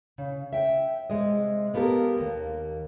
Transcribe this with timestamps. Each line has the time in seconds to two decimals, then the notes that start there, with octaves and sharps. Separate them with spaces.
0.18 C#3
0.53 E5 G5
1.10 C3 G#3 D#5
1.74 A#3 B3 G4 A4 A#4
2.17 D#2 A#3